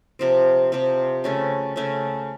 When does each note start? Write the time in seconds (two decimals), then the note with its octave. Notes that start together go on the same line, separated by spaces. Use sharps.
0.19 C3 F3 C4
0.72 C3 F3 C4
1.24 C#3 A3 C#4
1.76 C#3 A3 C#4